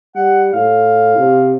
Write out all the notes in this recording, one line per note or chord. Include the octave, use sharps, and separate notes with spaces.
G3 F#5
A2 F5
C3